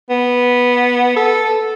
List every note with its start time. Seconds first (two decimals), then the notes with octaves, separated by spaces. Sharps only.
0.10 B3
1.16 A4